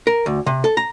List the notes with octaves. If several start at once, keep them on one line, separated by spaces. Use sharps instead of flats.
A#4
D2
C3
A4
A#5